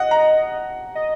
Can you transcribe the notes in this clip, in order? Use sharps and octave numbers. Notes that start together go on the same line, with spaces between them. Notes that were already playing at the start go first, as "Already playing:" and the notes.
Already playing: D#5 F#5
A#5
D#5